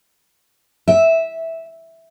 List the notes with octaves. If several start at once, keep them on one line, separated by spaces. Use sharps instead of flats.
E5